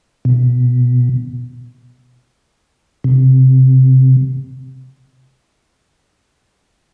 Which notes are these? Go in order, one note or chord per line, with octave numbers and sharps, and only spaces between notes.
B2
C3